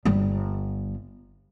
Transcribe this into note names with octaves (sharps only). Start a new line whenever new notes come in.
G1 G3